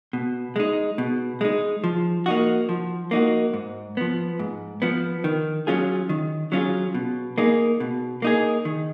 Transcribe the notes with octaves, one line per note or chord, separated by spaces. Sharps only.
B2
G#3 D#4
B2
G#3 D#4
F3
A#3 D#4 F#4
F3
A#3 D#4 F#4
G#2
F3 B3
G#2
F3 B3
D#3
F#3 C#4 F4 G#4
D#3
F#3 C#4 F4 G#4
B2
A#3 D#4 G#4
B2
A#3 D#4 G#4
D#3